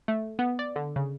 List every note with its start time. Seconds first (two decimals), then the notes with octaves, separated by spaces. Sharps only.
0.08 A3
0.39 B3
0.59 D5
0.76 D3
0.96 C#3